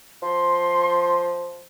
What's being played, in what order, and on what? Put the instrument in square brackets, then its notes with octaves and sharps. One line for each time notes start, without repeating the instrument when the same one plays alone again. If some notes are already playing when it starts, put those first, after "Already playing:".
[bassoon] F3 [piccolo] C6